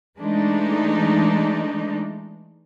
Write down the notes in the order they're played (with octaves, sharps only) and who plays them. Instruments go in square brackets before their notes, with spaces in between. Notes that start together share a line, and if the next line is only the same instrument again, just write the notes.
[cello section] E3 G#3 A3 D4 D#4